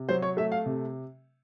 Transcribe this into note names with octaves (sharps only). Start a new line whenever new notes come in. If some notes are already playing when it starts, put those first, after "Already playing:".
Already playing: C3
F#3 C5
C#5
A3 E5
F5
C3